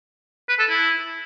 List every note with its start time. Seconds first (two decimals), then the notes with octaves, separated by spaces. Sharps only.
0.49 B4
0.59 A4
0.69 E4